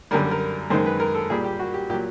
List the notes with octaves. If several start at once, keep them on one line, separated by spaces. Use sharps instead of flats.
F#2 D3 G3 A#4
A#4
F#2 D#3 G#3 C5
B4
A#4
A4
A#2 G3 G#4
G4
F#4
G4
A#2 F#3 G4